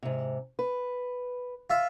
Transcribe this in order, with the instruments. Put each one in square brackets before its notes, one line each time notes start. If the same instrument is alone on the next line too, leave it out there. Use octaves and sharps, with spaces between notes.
[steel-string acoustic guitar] G#2 C3
B4
[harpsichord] F4 E5 F5